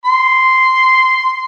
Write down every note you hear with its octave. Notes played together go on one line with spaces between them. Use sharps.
C6